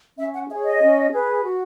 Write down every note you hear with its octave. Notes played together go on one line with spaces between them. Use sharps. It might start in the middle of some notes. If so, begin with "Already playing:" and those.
C#4 E5
F#5
G#4 C#5 E5
D#5
C#4
G#4 B4
F#4